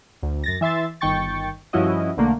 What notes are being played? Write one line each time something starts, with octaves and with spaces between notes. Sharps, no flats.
D2
F#2 A6 A#6
E3 E5 C6 A6
G1 D#3 G5 C#6 A6
G2 F3 C#4 E4 F#4 D#5
B1 D3 A3 A#3